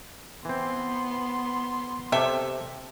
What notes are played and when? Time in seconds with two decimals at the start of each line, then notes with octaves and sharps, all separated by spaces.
0.45 E3 B3 C4 C6
2.12 C3 G4 A4 E5